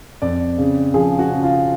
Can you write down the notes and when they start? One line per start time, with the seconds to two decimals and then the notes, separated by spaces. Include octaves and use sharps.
0.22 F2 D5
0.58 C#3
0.94 F3 G#4
1.19 F#4
1.30 C#3
1.43 F4